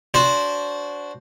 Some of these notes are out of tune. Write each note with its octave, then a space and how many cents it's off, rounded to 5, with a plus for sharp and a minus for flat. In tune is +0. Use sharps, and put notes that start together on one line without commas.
D4 -25 F#4 -5 C5 +0